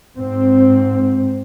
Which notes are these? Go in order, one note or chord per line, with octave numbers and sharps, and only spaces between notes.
G#2 C4